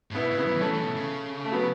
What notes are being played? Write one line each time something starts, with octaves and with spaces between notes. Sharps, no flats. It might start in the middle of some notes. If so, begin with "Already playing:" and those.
A2
B2 B3 E4
C#3
B3 E4
F#3
E3
F#3 A3 C#4
E3
B2
C#3
A3
F#3 B3